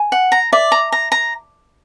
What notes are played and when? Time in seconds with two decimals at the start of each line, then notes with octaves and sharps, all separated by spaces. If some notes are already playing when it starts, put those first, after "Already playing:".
Already playing: G#5
0.12 F#5
0.32 A#5
0.53 D5 E5
0.72 A#5
0.92 A#5
1.12 A#5